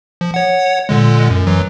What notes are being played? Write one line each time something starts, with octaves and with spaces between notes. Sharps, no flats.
F3
C#5 F#5
A#2 D3 G#3
F#2
F#2 E3 F#3